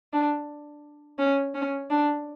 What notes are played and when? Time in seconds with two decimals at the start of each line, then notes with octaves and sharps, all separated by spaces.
0.13 D4
1.19 C#4
1.55 C#4
1.90 D4